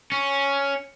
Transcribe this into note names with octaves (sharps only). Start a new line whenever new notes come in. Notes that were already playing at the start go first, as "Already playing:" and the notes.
C#4